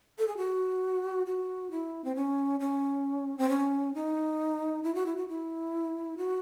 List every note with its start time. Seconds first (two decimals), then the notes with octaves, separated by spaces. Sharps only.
0.18 A4
0.27 G#4
0.37 F#4
1.26 F#4
1.71 E4
2.04 C4
2.15 C#4
2.60 C#4
3.38 C4
3.49 C#4
3.94 D#4
4.83 E4
4.94 F#4
5.06 E4
5.17 F#4
5.28 E4
6.17 F#4